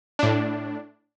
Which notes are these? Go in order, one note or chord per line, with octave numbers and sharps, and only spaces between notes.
A2 D4